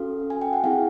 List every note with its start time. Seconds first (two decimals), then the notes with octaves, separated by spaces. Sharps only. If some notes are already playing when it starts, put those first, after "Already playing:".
Already playing: C#4 F#4 A4 F5
0.30 G#5
0.41 G5
0.53 F#5
0.64 C4 E4 G#4 F5